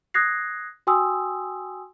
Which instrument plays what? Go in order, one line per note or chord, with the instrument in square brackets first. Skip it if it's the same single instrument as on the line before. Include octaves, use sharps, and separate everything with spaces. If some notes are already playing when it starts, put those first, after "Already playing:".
[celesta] D#6 F#6 G#6 A#6 C7
F#4 G5 G#5 C6 D#6 E6